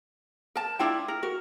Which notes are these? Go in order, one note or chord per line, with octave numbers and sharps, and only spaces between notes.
A#4 A5
D4 E4 F4 G5
A#4
F#4 A#4